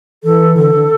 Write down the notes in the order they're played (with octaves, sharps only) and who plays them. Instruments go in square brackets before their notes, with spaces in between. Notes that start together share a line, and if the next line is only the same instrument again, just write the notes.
[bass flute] E3 [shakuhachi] A4
[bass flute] D3 [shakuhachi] A4
[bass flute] D3